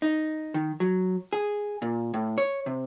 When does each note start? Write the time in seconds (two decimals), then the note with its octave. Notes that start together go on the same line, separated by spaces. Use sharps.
0.02 D#4
0.54 D#3
0.80 F#3
1.33 G#4
1.82 A#2
2.14 A2
2.38 C#5
2.66 C3